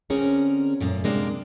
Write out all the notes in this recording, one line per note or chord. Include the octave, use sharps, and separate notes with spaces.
D3 C4 C#4 G#4 A#4
F#2 A#2 A3
C3 G#3 A#3 D4